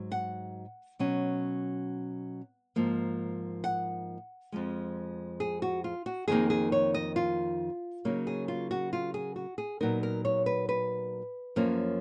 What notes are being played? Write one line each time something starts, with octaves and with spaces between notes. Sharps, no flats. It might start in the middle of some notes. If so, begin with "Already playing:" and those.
Already playing: G#2 F#3
F#5
B2 F#3 C#4
G#2 F3 A#3
F#5
F2 F3 G#3
G#4
F#4
F4
F#4
F2 D#3 A#3 D#4 G#4
G#4
C#5
D#5
F4
C#3 F#3 A#3 D#4
G#4
F4
F#4
F4
G#4
F#4
G#4
A#2 F#3 B3 D#4 A#4
A#4
C#5
B4
B4
F#2 F3 A#3 C#4